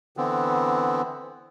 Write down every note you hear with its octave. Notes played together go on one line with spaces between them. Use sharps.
D3 E3 B3 C4